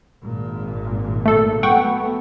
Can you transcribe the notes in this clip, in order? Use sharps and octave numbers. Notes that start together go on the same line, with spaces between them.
G#1 A#2
A3 A4
F#3 A3 B3 F#5 G5 C#6